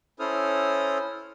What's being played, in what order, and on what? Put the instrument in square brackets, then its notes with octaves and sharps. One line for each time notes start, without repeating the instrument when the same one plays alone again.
[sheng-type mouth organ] C#4 E4 A4 C5 D#6 F6